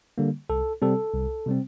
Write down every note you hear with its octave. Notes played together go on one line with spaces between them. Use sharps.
D3 G3 A#3
C2 A4
C3 G3 C4 A4
C2
C3 G3 C4